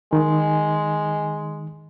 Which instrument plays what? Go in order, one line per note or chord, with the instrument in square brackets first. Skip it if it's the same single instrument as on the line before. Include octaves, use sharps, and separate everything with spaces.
[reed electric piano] D#3 [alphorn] G#3